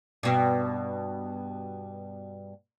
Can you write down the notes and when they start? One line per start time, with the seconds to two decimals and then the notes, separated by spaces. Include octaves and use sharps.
0.23 G2 B2